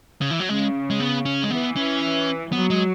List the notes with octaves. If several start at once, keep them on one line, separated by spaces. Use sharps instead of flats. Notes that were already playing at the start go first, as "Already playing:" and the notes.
C#3
E3
F#3
C#3 G#3
G#3
B3
C#4
G#3
E3 B3
C#4
F#3 B3
G#3